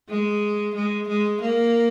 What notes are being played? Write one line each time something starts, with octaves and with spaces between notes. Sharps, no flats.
G#3
G#3
G#3
A#3